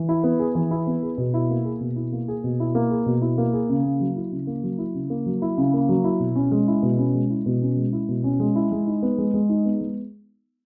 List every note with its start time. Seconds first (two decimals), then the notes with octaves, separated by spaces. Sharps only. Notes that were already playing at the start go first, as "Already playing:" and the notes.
Already playing: E3
0.09 E4
0.24 B3
0.39 G#4
0.55 E3
0.71 E4
0.87 B3
1.03 G#4
1.18 B2
1.34 E4
1.50 A#3
1.65 G#4
1.81 B2
1.96 E4
2.12 A#3
2.28 G#4
2.44 B2
2.60 E4
2.75 A#3
2.90 G#4
3.06 B2
3.22 E4
3.38 A#3
3.53 G#4
3.70 C#3
3.85 A#3
4.00 F#3
4.16 E4
4.32 C#3
4.47 A#3
4.63 F#3
4.78 E4
4.95 C#3
5.10 A#3
5.26 F#3
5.42 E4
5.58 C#3
5.74 A#3
5.89 F#3
6.04 E4
6.20 B2
6.36 C#4
6.51 G#3
6.68 E4
6.83 B2
6.98 C#4
7.14 G#3
7.30 E4
7.46 B2
7.62 C#4
7.77 G#3
7.93 E4
8.09 B2
8.24 C#4
8.40 G#3
8.56 E4
8.72 G#3
8.87 D#4
9.03 B3
9.18 G#3
9.34 G#3
9.49 D#4
9.65 B3
9.81 G#3